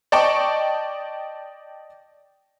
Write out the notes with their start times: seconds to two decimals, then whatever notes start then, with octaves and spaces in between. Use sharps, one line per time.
0.12 D5 D#5 G5 A5 C#6 D6